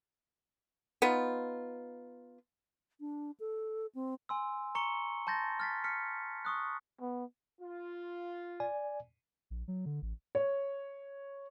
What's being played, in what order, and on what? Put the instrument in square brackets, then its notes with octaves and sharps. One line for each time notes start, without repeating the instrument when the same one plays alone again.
[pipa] B3 D#4 F4
[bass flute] D4
A4
C4
[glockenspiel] G#5 C6 E6
A#5 C#6 C#7 G7
A5 C6 G6 A6 A#6
F6 A6 B6
F6 B6 C#7
C#6 D#6 F#6
[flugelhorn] B3
[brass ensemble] F4
[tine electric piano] D5 G#5
[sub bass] A#1
F#3
D3
A1
[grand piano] C#5